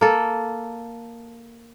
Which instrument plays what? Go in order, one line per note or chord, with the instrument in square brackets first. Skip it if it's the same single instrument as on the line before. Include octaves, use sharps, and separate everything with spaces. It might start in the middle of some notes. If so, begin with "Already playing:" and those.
[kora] A#3 A4